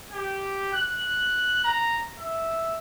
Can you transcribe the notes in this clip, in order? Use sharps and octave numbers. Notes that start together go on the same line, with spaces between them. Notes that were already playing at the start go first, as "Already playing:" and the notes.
G4
F#6
A#5
E5